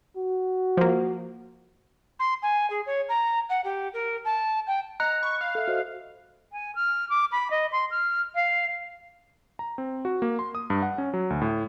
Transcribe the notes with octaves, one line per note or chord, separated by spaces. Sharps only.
F#4
F3 A#3
C6
G#5
G#4
C#5
A#5
F#5
G4
A#4
A5
G5
D#5 A#5 F#6 C#7
B5 C#6
F5
A4 E5
F#4 C5 D#5
G#5
F6
D6
B5
D#5
C6
F6
F5
A#5
C4
F#4
A#3
C6
D#6
G2
F#5
C#4
F#3
D2
A2